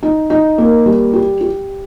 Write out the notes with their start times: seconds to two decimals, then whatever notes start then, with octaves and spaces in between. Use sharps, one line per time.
0.03 D#4
0.30 D#4
0.58 A#3
0.86 G3
1.13 G4
1.41 G4